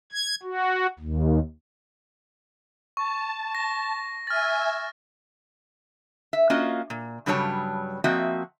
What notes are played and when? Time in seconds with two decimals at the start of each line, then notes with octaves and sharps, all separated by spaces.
0.12 G#6
0.43 F#4
0.99 D#2
2.97 A5 C#6
3.55 A#6
4.27 E5 G#5 F6 A6
6.33 E5
6.50 A#3 C#4 F4 F#4 D#5
6.90 A#2
7.26 G2 C#3 F#3 G3 C#5 A5
8.04 F3 A#3 C4 F#4 D#5 E5